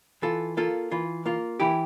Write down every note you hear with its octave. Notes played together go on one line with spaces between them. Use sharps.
E3 F4 A4
A#3 F4 A4
E3 F4
A#3 F4
E3 E4 G4